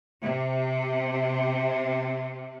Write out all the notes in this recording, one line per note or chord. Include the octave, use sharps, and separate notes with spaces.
C3